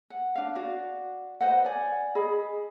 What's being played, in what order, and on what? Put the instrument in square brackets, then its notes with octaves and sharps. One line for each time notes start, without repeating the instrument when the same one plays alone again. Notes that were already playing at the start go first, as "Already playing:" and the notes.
[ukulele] F#5
D4 F5
F#4 D5
B4 C5 D#5 F#5
D5 G#5
G#4 D#5 B5